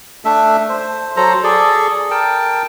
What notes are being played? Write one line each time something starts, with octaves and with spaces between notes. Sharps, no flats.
A3 D4 E5
C5
F#3 A4 C5 A#5
G#4 A4 D5
A#4 G5 A5